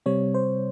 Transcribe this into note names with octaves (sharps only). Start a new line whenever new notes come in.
C3 G3 C4 C#5
C5